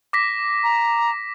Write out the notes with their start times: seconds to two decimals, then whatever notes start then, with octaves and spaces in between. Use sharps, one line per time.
0.13 D6 A#6 B6
0.63 A#5